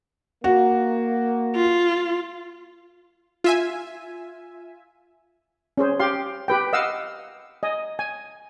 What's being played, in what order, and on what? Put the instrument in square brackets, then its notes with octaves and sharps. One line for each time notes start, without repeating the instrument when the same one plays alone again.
[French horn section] A#3 [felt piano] F#4
[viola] F4
[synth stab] F4 E5 G#5
[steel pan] C#4 G#4 C5
G4 F5 C6
G4 B4 G5
D#5 F5 F#5 E6
D#5 G#5
G#5